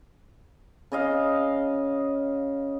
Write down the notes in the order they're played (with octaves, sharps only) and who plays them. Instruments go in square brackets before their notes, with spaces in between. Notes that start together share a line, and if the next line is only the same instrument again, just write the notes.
[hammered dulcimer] C#3 D#5 F5